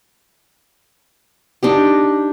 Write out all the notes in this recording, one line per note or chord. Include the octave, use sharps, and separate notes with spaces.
D4 D#4 G4